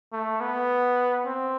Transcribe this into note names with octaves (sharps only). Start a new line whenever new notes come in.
A3
B3
C4